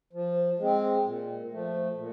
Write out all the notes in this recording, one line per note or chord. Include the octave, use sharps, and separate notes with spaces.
F3
G#3 C4
A#2
F3 A3
A#2